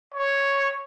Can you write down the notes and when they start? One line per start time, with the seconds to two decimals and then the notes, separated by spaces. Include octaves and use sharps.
0.15 C#5